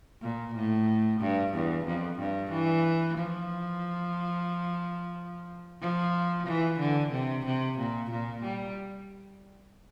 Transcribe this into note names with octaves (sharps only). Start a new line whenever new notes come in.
A#2
A2
G2
E2
F2
G2
E3
F3
F3
E3
D3
C3
C3
A#2
A#2
G3